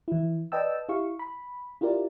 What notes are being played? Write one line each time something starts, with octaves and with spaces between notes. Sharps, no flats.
E3 E4
B4 D5 D#5 G5 A5 E6
E4 G4 F5 C#6
B5
E4 F4 G4 A#4 D5